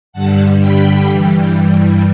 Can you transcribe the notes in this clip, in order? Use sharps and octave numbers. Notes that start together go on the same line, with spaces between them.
G2 D3 G3 F#5 A5
G5 B5
G2 E3 G3